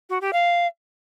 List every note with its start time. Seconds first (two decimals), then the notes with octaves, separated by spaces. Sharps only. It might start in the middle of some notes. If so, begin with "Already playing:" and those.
0.09 F#4
0.21 G4
0.33 F5